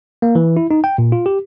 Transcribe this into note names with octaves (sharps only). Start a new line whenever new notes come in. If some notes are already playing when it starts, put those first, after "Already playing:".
A#3
E3
E4
D#4
G5
A#2
F4
G4